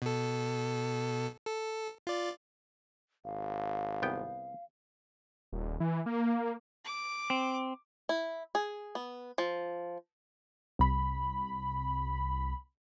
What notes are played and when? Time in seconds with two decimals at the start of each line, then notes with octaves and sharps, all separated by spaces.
0.02 B2 A4
1.46 A4
2.07 F4 D5
3.25 G#1 F5
4.03 C2 B3 G5
5.53 D#1
5.80 E3
6.06 A#3
6.84 D6
7.30 C4
8.09 E4
8.55 G#4
8.95 B3
9.38 F3
10.79 C2 B5